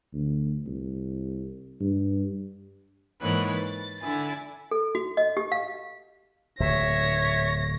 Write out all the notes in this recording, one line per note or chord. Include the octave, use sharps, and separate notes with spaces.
D2
C2
G2
G#2 E3 A#3 B4 C#5 F#5
A6
D3 E4 G#5 A6
A4
F#4
D#5
G4
F5
D1 A#2 C#5 E5 A#6